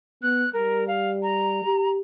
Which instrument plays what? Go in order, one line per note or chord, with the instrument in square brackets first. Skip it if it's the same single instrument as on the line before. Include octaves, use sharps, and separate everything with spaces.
[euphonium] B3 [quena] F#6
[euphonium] G3 [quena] A#4
[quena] F5
A#5
[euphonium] G4